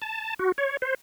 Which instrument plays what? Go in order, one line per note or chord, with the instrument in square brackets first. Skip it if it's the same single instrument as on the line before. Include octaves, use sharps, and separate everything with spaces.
[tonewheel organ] A5
F#4
C#5
C5